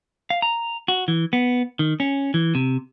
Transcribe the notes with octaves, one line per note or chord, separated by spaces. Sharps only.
F5
A#5
F#4
E3
B3
D#3
C#4
E3
C3